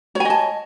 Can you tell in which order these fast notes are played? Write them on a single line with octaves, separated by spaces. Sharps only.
C#5 G#5 D#5 A5